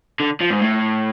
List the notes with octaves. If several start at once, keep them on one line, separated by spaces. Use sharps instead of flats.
D3
F3
G#2
A2